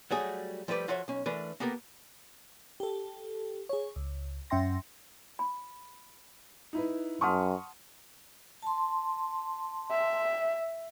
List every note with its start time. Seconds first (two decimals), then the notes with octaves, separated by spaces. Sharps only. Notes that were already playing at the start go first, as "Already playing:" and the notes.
0.11 F#3 G3 A3 F#4 G#4
0.68 F3 G3 A3 B4 D5
0.88 F3 F4 F#4 A4 C#5 E5
1.08 B1 C#4
1.26 E3 A3 D4 A#4 B4
1.60 A#3 B3 G4 A4 A#4
2.80 G4 A4
3.69 G#4 C#5
3.96 C#2
4.50 F#2 C#4 E5 G5 C6 A#6
5.39 B5
6.73 D#4 E4 B4
7.21 F#2 F#5 A5 C6 C#6 D#6 F6
8.63 A5 C6
9.91 E5